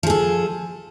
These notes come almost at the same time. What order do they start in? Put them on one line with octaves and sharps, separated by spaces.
F3 G#4 A4